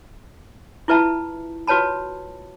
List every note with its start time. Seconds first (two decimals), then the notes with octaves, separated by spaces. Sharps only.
0.88 E4 F4 B4 E5 A5 B5
1.67 F4 F#4 B4 C#5 A5 B5